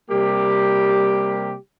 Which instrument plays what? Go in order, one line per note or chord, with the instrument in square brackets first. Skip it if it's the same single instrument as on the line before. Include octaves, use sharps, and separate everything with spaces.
[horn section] C3 G3 A#3 G4